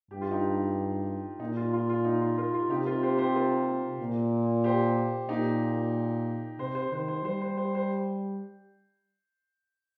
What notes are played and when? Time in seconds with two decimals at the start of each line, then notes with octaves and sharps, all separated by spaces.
0.11 G2 G4
0.21 F4
0.31 D#4 G4
1.40 A#2 D#4
1.56 F4
1.73 F4
1.89 F4
2.05 D#4
2.21 F4
2.38 F4 A#4
2.54 F4
2.70 C3 D#4 G4
2.86 F4 A#4
3.02 G4 C5
3.18 G4 C5
3.35 F4 A#4
4.00 A#2
4.64 G4 C5
5.29 A#2 D#4 G4
6.58 C3 C5
6.75 C5
6.91 D#3 C5
7.08 C5
7.24 G3 C5
7.41 C5
7.57 C5
7.75 C5